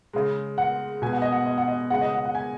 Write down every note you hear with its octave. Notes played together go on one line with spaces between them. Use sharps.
C#3 G#3
F#5
B2 G#3 G#5
F#5
D#5
F#5
D#5
F#5
D#5
C#3 G#3 F#5
D#5
F#5
F#5
G#5